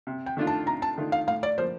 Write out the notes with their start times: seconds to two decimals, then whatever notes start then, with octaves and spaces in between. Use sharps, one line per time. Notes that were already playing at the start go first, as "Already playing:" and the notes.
0.07 C3
0.26 G5
0.37 D#3 A3 D4 F4
0.47 A5
0.67 C3 A#5
0.82 A5
0.98 D#3 A3 D4 F4
1.12 F5
1.27 A2 F5
1.43 D5
1.58 F3 A#3 C5